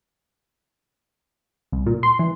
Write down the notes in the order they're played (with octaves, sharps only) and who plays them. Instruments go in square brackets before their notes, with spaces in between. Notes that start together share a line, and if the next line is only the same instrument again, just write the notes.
[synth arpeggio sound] C2
A#2
C6
E3